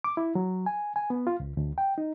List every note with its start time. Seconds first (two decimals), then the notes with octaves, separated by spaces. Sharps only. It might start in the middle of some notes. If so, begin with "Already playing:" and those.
0.04 D6
0.17 E4
0.35 F#3
0.66 G#5
0.96 G#5
1.10 B3
1.27 F4
1.40 C#2
1.57 D2
1.78 G5
1.98 D#4